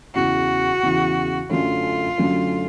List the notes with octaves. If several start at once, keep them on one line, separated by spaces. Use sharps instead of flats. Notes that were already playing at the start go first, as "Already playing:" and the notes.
E2 C#3 E3 F#4
E2 C#3 E3
F#2 D3 F#3 A3 C#4 F4
F#2 D3 F#3 A3 C#4